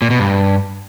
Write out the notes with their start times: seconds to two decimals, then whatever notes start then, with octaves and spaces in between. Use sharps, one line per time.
0.02 A#2
0.10 B2
0.19 G2